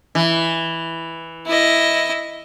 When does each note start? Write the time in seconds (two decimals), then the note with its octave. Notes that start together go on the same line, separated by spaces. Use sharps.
0.15 E3
1.46 E4 D#5